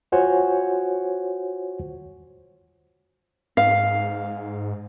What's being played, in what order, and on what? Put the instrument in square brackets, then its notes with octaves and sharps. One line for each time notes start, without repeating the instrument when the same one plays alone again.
[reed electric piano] F4 F#4 C5 C#5 F#5 G#5
[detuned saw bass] G#2 [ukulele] F5